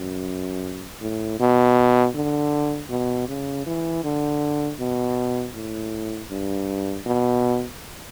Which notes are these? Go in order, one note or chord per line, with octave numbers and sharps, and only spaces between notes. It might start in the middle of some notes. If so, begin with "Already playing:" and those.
Already playing: F#2
A2
B2
D3
B2
C#3
E3
D3
B2
A2
G2
B2